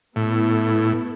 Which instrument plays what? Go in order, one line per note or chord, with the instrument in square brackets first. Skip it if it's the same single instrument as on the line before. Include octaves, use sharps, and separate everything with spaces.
[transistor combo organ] A2 [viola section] B3 E4 A4